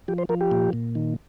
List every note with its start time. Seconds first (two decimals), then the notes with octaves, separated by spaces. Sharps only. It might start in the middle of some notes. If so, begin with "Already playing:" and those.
0.08 F3 G4
0.18 C5
0.29 F3 A#4
0.41 G4
0.51 A#2
0.73 A#2
0.95 D#3